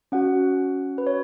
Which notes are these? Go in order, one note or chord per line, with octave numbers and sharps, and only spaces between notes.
C#4 F#4 F#5
B4
C#5